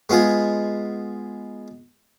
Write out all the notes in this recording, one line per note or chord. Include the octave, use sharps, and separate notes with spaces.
G#3 B3 F4 G#4